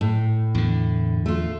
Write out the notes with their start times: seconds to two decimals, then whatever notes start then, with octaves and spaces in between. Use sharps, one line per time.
0.01 A2
0.55 E2 D3
1.26 A3 F4